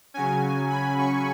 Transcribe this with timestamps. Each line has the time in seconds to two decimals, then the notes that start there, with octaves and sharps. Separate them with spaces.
0.14 C#3 F#3 C#4 G#5
0.70 B5
0.99 C#6